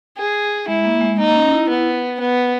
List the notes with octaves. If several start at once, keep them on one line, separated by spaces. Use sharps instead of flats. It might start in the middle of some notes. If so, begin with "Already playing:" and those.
G#4
G#3 E4
A#3
G#3
A#3 D#4
C#4
E4
B3
B3